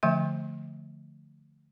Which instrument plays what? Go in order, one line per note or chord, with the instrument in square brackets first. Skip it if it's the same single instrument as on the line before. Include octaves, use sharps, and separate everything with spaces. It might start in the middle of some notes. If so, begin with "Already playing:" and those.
[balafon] D3 F3 A3 E5